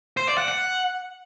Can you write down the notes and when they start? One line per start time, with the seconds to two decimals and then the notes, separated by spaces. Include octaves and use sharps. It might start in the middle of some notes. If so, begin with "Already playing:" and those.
0.17 C5
0.27 D5
0.38 F#5
0.48 F#5